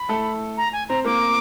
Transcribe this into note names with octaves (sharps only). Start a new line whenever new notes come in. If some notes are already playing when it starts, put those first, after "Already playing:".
Already playing: B5
A3 A4
A#5
G#5
C4 C5 A#5
A#3 A#4 D6